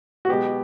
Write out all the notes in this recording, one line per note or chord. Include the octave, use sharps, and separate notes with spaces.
F#4
B2 G#3 B3 G4